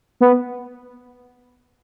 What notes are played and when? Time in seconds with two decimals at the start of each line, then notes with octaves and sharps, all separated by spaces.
0.21 B3